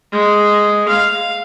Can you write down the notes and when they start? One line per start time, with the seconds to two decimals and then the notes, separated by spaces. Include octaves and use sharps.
0.13 G#3
0.88 F5